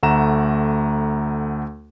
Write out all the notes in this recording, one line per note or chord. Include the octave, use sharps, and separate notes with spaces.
D2 A3 F#5 A#5 E7